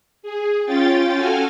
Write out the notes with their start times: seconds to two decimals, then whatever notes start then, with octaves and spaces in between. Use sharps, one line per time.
0.22 G#4
0.66 C#4 F4 G5 A6
1.14 F#4 A4 G#5 F6